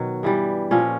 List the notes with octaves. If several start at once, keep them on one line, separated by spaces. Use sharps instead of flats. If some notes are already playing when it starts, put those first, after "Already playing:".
Already playing: B2 D#3 F#3
G2 E3 G3
A#2 F3 C#4